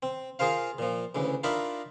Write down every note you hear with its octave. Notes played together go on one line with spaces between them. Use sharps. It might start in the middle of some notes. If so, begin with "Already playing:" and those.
C4
F4 G#4 A#4 C5 F5
A#2 F3
D2 C#3 E3
D4 D#4 F4 A#4 E5 B5